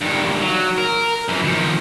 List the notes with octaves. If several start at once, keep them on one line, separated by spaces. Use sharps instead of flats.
G2 D#3
F#3
A#4
F#2 E3
D#3 F3